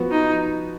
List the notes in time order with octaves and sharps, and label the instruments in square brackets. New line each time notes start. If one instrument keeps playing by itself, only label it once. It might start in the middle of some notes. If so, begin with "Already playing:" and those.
Already playing: [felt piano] F3 B3 F#4 B4
[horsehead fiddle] D#4